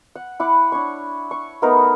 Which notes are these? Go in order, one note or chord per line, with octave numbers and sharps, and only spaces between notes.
F#5
E4 F#5 D6
D4 C#5 C#6
C#6
A3 B3 D#4 A#4